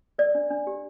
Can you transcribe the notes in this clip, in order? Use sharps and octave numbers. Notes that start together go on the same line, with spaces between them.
A#4 D5
D4
D4
G4